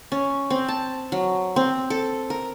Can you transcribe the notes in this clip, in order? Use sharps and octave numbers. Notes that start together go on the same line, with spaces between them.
C#4
C4
A5
F#3
C4
A4
A#4